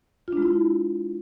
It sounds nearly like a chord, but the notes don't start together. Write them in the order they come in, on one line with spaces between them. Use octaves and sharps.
F4 D4 G#3 E4